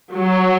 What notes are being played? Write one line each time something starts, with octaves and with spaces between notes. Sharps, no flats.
F#3